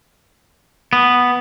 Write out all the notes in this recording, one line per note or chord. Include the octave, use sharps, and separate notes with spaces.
B3